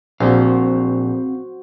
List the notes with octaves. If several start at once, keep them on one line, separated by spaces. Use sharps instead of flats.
A#1 C4 F#4 C5 F5